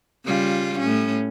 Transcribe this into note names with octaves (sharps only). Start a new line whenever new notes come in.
C#3 G3 F4
A2 C#4